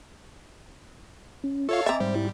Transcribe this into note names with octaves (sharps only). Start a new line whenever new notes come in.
C#4
F4 A4 C#5 E5 F5 C#6
C4 D#5 E5 G#5 A#5 D6 A6
G#2 G3 C5
G#2 E4